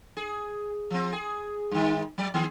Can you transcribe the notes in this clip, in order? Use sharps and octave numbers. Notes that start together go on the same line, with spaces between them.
G#4
F3 C4
G#4
G2 D#3
F#3 D5
D#3 B3 G#4